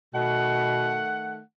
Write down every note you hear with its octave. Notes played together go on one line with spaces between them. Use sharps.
B2 D#3 A3 F#5